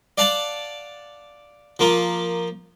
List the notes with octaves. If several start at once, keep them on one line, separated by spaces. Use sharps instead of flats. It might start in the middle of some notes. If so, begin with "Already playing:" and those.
D5 F5 F#5 A5
F3 A#3 F4